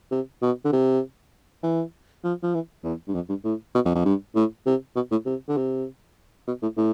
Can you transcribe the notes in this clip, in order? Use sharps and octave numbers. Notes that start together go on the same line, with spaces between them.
C3
B2
D3
C3
E3
F3
F3
E3
E2
G2
F2
G2
A2
B2
F2
F2
G2
A2
C3
B2
A2
C3
D3
C3
B2
A2
A2